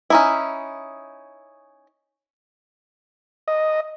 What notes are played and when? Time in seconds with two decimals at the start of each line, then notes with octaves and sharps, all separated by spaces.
0.10 C#4 D#4 E4
3.48 D#5